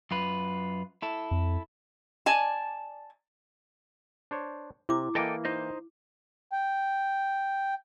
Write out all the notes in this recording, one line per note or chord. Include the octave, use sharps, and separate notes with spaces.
F#2 F4 B4
E4 A4
F2
D5 G#5 A5
D4 C5 C#5
C3 E4 D6
E3 A#3 A4 D#5 G5
D#4 C5 D#5
G5